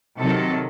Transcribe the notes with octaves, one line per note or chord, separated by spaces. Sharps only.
C3 D#3 F#3 A4